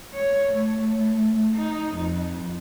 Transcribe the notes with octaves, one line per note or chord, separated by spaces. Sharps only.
C#5
A3
D#4
F2